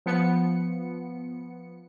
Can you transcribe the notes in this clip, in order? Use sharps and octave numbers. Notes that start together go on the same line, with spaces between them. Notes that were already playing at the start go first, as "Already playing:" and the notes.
F3 B3 C#7